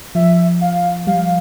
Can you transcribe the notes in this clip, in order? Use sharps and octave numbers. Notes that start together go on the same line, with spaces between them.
F3 E5
F5
G3 F5